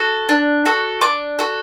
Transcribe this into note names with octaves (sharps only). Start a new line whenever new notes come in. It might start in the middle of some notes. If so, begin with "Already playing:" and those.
Already playing: F#4 A4
D4
F#4 A4
D4 D6
F#4 A4